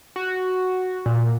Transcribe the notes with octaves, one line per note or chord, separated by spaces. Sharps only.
F#4
A#2